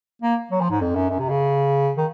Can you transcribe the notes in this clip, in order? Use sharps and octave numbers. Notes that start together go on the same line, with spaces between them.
A#3
F#3
F3
G#2
F2
F#2
F#2
C3
C#3
D#3